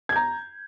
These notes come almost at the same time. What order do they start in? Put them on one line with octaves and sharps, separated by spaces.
G#6 G6 A#5